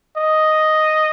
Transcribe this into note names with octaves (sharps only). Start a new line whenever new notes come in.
D#5